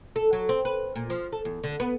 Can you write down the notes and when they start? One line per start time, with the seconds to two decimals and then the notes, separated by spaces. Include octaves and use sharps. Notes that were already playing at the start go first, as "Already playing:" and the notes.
0.16 A4
0.33 F#3
0.49 C4
0.65 B4
0.96 A#2
1.10 F3
1.32 A4
1.45 E2
1.64 D3
1.80 B3